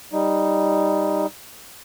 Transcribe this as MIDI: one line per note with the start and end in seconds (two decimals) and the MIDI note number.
0.13 1.26 55
0.13 1.26 63